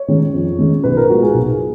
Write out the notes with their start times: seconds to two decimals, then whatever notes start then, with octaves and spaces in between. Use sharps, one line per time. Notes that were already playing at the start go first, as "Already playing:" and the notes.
Already playing: C#5
0.08 D#3 G#3 C#4
0.33 F2
0.59 D#3 G#3 C#4
0.83 B1 B4
0.97 A#4
1.10 A#2 G#3 B3 F#4
1.23 G#4
1.34 B1